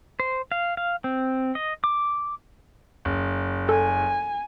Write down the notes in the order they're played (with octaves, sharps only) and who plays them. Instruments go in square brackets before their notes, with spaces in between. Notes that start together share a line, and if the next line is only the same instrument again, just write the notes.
[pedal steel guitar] C5
F5
F5
C4
D#5
D6
[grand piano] F#1
[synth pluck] A4 [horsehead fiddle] G#5